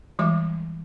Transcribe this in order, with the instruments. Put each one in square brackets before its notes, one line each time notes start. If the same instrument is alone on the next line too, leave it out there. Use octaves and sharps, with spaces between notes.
[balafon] E3 G3 G#3 D6